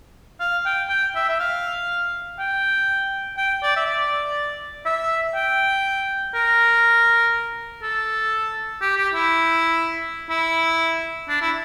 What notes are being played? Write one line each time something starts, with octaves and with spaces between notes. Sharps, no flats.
F5
G5
G5
E5
E5
F5
G5
G5
D5
E5
D5
E5
G5
A#4
A4
G4
G4
E4
E4
D4
E4